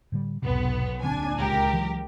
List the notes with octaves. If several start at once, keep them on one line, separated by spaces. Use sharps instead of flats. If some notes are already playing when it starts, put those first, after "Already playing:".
A2 D3 G3
B1 E2 G#2 C3 B3
D1 A#1 D3 C4 D4 G#5
C#2 G4 A#4
E3 F#3